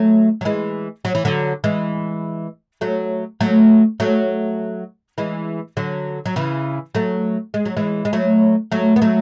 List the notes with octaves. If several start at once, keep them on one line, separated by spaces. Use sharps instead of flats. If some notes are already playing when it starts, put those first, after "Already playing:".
Already playing: F#3 A3
F#3
E3 G#3
F#3
E3
D3 F#3
E3 G#3
F#3 A3
F#3 A3
F#3 A3
E3 G#3
D3 F#3
F#3
C#3 E3
F#3 A3
G#3
F#3
E3 G#3
G#3
F#3 A3
F#3 A3
B3
F#3 A3